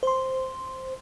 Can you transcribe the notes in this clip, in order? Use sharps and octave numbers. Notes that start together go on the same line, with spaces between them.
C5 C6